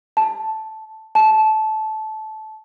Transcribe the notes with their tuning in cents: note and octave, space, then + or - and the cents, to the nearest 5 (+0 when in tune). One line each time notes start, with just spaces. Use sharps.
A5 -5
A5 -20